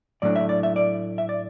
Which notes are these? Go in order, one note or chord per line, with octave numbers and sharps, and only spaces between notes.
A2 F#3 A3 D4 D5
E5
D5
E5
D5
E5
D5